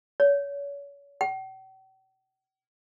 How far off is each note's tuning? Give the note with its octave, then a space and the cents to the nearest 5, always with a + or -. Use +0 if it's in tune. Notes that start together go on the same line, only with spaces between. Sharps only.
C#5 +35
G5 -45